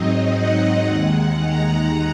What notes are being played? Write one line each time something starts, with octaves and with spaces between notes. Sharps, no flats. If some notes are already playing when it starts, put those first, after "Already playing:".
Already playing: G#2 F#3 C4 D#4 D#5
F#5
D#2 D#3 G#3
A#5